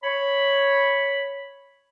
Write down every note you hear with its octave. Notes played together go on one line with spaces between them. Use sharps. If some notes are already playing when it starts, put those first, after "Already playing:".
C#5 B5